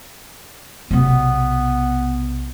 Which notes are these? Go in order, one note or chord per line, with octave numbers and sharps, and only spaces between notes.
B1 C3 B3